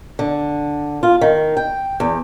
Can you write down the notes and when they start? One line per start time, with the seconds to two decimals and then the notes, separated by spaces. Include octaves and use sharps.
0.19 D3
1.03 F4
1.21 D#3
1.57 G5
2.00 E2